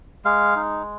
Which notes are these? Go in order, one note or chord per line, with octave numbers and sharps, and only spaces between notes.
G#3 F5
D#4